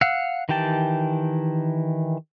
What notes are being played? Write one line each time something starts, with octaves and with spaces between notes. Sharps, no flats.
F5 F#5 E6
D#3 E3 G4 G5 A5